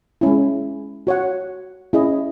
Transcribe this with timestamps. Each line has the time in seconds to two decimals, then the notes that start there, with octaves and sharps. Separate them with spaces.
0.21 G#3 C#4 E4
1.07 F#4 C#5 F#5
1.93 C#4 E4 G#4 D#5